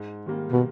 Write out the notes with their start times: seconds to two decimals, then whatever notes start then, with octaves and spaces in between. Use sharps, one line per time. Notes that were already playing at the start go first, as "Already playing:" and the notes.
Already playing: G#2
0.26 D#3 G3 A#3
0.51 B2